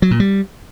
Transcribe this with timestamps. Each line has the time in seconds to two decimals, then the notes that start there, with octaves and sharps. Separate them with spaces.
0.02 F#3
0.11 A#2
0.20 G3